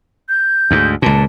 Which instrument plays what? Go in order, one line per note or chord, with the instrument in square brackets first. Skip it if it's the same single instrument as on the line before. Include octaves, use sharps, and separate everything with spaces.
[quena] G6
[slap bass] D2 G#2
[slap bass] C#2 A#2 [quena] A5